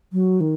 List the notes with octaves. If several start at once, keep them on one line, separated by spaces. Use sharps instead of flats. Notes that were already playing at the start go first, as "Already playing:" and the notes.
F#3
D#3